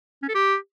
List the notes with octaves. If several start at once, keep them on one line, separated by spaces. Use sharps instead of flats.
C#4
A4
G4